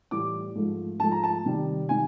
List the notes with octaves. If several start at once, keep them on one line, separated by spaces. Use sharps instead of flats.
A2 E3 G3 D6
G#2 F3 A3
G#2 F3 A3 A5
A#5
A5
C3 D#3 G3
C3 D#3 G#5